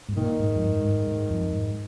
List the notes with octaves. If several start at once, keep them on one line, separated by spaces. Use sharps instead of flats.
G#2
A#2 D#3
G#2
F2
G#2
G#2
G#2
F2
G#2